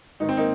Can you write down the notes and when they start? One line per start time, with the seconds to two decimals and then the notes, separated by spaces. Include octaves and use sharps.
0.20 G#2 D#3 D#4
0.29 C4
0.37 A#3 D#4